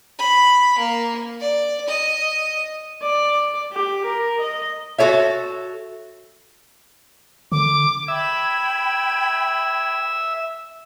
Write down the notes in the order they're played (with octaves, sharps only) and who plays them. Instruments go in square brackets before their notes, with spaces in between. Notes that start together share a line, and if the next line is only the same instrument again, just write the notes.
[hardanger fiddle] B5
A#3
D5
D#5
[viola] D5
G4
A#4
D#5
[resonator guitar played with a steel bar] F#4 A4 C#5 E5
[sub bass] D3 [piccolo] D6
[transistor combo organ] E5 [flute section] G5 B5 G#6